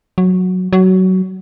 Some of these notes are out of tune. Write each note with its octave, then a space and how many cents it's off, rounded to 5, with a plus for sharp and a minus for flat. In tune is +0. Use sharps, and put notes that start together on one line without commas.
F#3 -10
F#3 +15